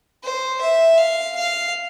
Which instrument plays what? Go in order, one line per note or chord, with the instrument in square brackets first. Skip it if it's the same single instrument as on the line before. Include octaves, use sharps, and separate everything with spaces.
[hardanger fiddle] C5
E5
F5
F5